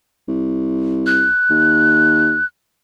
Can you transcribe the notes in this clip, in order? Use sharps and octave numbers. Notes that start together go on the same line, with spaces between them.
C2
F#6
D#2